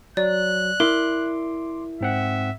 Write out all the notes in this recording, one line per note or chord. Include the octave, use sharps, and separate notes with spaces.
F#3 D5 F#6
E4 A#4 C6 D6
G#2 C4 E5 F#5